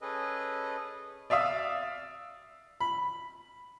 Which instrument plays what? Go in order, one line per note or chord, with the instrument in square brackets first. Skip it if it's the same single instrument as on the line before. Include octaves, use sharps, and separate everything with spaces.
[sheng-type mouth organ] C#4 G#4 A4 B4 D#5
[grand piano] D5 E5 F5 D#6 E6
[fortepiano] B5